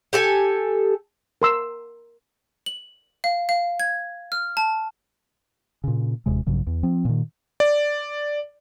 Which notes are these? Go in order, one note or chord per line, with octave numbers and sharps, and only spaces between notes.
G4 A4 G#5
A#4 C6 E6
F#7
F5
F5
G#6
F6
A5
A#2 C#3
E1 D#2 C3 G#3
A#1 G2 C#3 F#3
E2
F3 C4
A#2 D#3
D5